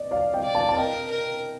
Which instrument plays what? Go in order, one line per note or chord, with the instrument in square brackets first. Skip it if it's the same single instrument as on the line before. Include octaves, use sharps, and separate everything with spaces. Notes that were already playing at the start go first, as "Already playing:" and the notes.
Already playing: [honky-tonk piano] D5 D#5
D5 F5
D#5 G5
[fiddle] D5
[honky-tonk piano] F5 A5
A5
[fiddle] A#4 [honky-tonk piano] D#5 G5
[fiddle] A#4